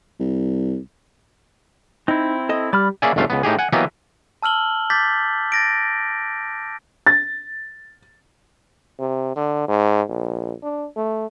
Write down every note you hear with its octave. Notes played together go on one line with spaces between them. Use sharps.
C2
C4 D#4 E4
A4 D#5
G3 D5 B5 F6
A#3 C#4 G#4 D5 E5 G#5
G1 C#2 A3 F4 F5
C#2 B3
A2 D#4 G4 G#4
F#5 G#5
E3 F#3 A#3 B3 G4 D#5
A5 E6 F6 F#7 G7
D6 G6 A6 B6
A6 A#6 D7
A6
C3
D3
G#2
A#1
D4
A3